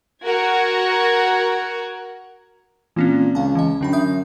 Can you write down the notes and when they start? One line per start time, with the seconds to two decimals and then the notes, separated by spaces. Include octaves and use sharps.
0.24 F#4 A#4 F#5 G#6
2.96 A#2 E3 C4 C#4
3.35 C#2 F5 A5
3.55 E3 D#5
3.81 F#2 D3 D4 B5
3.93 E5 D#6 G6